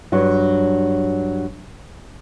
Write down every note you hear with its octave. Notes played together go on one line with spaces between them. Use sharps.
G2 F#3 D4 F#4